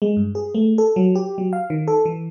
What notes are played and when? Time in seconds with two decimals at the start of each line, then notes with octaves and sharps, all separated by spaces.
0.02 G#3
0.16 G2
0.35 G#4
0.55 A3
0.78 A4
0.96 F#3
1.15 G4
1.38 F#3
1.53 F5
1.70 D#3
1.88 A4
2.05 E3